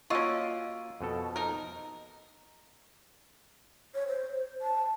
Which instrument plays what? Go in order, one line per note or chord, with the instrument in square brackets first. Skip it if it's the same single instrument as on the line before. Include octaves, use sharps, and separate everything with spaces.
[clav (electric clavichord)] A#3 F#4 [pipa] C#4 F4 [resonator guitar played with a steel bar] D#5 [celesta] C#6 E6 D7
[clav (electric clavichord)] F2 B2 A4
[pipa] D#4 A#4
[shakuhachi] C#5
C5
A5